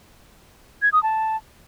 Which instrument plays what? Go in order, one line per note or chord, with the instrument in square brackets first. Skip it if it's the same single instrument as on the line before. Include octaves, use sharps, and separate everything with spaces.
[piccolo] G#6
D#6
A5